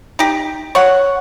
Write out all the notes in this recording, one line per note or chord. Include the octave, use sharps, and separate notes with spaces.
D#4 G4
C#5 F#5